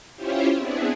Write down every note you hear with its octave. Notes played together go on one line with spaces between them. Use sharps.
C#4 E4 F4 G4 C5 C#5
B3 C4 D4 E4 G#4